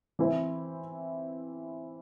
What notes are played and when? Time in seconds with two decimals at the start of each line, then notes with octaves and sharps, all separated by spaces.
0.19 E3 C4 E4 C5